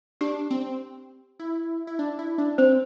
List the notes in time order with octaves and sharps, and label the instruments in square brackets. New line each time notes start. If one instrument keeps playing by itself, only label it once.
[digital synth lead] D4 [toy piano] G4
[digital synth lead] C4
E4
E4
D4
E4
D4
[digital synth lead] C4 [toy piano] C5